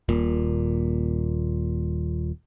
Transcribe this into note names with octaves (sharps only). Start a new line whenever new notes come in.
D#1 A#2